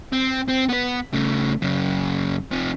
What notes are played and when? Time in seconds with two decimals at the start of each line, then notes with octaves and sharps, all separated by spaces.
0.13 C4
0.49 C4
0.69 B3 B4
1.13 C#3 A3
1.62 F#2 C#3
2.52 C3 F3